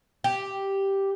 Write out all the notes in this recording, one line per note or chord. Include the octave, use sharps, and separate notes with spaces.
G4